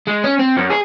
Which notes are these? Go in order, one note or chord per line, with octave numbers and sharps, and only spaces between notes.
G#3
C#4
C4
F#2
G#4